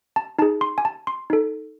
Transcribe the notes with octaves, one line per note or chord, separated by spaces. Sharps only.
A5
D#4 G#4 A5
C6
G#5
A5
C6
D#4 A4